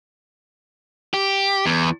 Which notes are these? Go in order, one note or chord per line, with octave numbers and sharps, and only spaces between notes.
G4
E2